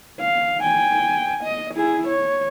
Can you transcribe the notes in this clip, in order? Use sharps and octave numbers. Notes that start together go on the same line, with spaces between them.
F5
G5 G#5
D#5
E4 G#4
C#5